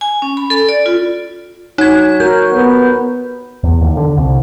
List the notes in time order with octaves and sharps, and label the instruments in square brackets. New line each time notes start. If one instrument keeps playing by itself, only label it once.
[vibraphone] G#5
C#4
B5
A4
D5
F4
[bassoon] F#3 [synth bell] D#4 G#6
[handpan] F#4 A#4 [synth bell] G6
[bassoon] D#2 [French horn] B3
[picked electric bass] E2
D#2
D3
C2